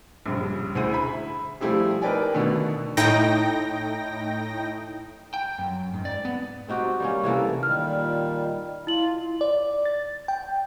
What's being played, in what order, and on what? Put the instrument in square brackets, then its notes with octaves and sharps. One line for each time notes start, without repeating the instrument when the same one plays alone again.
[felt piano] A#1 G2 C#3
D2 E4 G#4 C5 D#7
E5 B5
F3 G3 A3 E4 G4 G#4
D#4 A#4 B4 D5 G5 G#5
B2 D3 D#3 A3 B3
[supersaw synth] A2 D#4 G5 A#6
[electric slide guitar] G5
F#2
G#2
D5
B3
[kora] C4 D#4 F#4 G4
G3 A#3 C#4
C3 E3 A#3 A4
[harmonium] A#2 D#3 G3 [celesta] F6
[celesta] E4 F#7 [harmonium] F4
[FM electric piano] D5
A6
G5